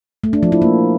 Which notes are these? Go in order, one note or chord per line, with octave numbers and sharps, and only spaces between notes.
A3
D4
F3
E4
A#3